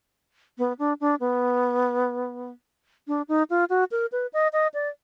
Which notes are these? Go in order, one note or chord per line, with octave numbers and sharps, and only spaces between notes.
B3
D4
D4
B3
D4
D#4
F4
F#4
A#4
B4
D#5
D#5
D5